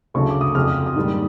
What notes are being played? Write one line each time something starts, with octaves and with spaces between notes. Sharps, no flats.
D2 C#3 F#3 A3 C#6
D6
D#6
F2 C#3 F#3 F6
D#6
D#6
G#2 D#3 G3 A#3